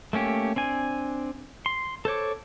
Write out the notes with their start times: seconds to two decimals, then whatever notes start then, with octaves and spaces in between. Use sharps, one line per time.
0.13 A3 A#3 C#4 G4
0.56 C4 D4 G#5
1.66 C6
2.05 A4 C5 C#5 D6